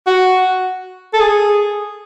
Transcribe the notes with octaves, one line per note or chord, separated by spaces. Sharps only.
F#4
A4
G#4